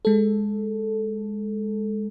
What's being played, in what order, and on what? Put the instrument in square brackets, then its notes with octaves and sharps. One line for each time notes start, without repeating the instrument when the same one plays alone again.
[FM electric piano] G#3 A4